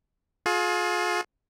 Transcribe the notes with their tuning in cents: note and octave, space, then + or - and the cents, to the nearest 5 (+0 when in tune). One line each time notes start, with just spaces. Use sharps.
F4 +30 G#4 +35